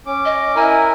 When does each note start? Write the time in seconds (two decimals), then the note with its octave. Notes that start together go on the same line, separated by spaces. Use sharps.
0.06 C#4 D6
0.25 D#5
0.56 E4 A#4 G#5